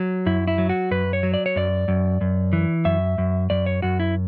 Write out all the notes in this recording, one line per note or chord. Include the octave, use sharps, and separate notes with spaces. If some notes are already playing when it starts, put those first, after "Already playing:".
Already playing: F#3
F#2 E4
E4
F#3
F#4
F#2 B4
C#5
F#3
D5
C#5
F#2 D5
F#2
F#2
E3
F#2 E5
F#2
F#2 D5
C#5
F#2 F#4
E4